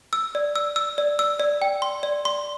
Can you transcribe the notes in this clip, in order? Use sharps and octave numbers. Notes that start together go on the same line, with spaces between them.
E6
D5
E6
E6
D5
E6
D5
G5
C6
D5
C6